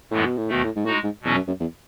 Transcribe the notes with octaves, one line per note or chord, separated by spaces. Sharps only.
F#2 A2 E3 G#3 B3
B2
A2
D#2 B2 D#3 A3
A2
G#2
A2 G#3 D#4 F#4
G#2
E2 B2 F#3 C#4 F#4
F#2
F#2
E2